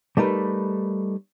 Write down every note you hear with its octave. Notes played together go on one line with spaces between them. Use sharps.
G3 A3 D#4 A#4 B4